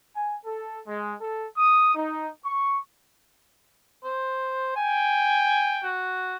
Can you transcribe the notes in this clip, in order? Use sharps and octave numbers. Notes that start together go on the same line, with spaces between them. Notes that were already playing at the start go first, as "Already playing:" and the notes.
G#5
A4
G#3
A4
D#6
D#4
C#6
C5
G5 G#5
F#4